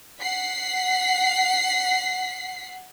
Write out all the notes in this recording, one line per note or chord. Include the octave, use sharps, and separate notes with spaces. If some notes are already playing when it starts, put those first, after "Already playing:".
F#5 B6 C7